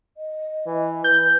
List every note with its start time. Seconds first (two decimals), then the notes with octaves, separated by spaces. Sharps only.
0.17 D#5
0.66 E3
1.04 E3 B4 G6